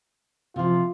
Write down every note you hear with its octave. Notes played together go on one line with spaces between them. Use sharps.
C3 F3 F4